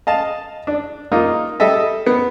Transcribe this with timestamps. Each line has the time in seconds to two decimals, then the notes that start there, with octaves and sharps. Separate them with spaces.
0.07 D#5 F5 A5
0.67 D4
1.12 A#3 D#4 F4
1.60 G3 A4 D#5 E5
2.06 B3